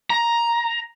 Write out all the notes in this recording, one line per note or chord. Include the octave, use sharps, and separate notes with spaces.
A#5